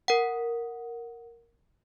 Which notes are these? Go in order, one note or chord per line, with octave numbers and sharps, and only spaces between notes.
A#4 F#5